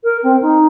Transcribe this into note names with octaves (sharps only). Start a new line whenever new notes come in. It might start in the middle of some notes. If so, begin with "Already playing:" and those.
A#4
C4
D#4